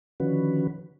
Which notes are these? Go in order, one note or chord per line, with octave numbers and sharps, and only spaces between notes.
D3 D#3 F3 C#4 F#4 B4